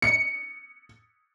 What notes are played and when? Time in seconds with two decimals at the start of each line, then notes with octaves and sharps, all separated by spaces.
0.02 C#7